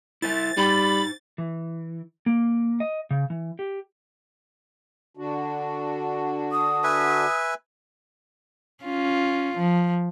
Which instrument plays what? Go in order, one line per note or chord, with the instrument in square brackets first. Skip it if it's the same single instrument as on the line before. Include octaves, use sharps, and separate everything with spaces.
[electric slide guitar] E4 C5 E5 [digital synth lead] A6
[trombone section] G3 [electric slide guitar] D#4 C5 [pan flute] B5
[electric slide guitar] E3
A#3
D#5
C#3
E3
G4
[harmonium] D3 D4 F#4
[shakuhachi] D#6
[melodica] B4 E5 G#5
[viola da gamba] C#4 F4
F3